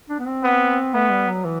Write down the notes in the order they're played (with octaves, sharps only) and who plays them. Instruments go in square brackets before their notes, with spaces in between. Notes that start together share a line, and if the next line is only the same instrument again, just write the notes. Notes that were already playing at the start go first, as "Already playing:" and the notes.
[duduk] D4
B3
C4
[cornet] B3
[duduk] A3 [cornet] B3
[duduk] G3
F#3
E3